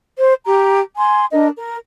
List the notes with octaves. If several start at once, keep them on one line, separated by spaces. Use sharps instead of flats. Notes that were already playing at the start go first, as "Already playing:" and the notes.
C5
G4 A#5
G#5 C6
D4 A#4 D#5
A#4